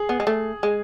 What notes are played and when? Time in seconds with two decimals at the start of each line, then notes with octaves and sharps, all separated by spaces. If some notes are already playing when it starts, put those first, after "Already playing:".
Already playing: G#4
0.09 B3
0.20 G#3
0.27 A3
0.63 G#3